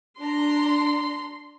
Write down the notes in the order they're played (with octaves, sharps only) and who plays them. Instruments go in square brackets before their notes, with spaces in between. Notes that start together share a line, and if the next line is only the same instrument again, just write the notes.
[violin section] D4 A#5 [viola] C6